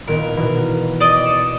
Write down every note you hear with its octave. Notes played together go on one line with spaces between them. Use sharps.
A#2 D#3 B3 A#4
B2 E3
D5 D#5
C#7 E7